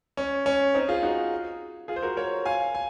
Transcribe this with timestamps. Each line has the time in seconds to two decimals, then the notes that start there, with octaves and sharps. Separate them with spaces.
0.17 C#4
0.46 C#4
0.74 C4 D#4
0.88 F4 G#4
1.03 D#4 F#4
1.88 F4 G#4
1.96 C5
2.02 F#4 A#4
2.17 A#4 C#5
2.46 F5 G#5
2.75 G#5